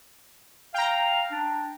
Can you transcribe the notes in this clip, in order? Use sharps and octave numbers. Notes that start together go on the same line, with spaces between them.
F5 G5 A#5
D4